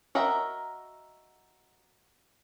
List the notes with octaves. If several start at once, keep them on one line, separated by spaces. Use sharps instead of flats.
F#4 A#4 D#5 E5 A#5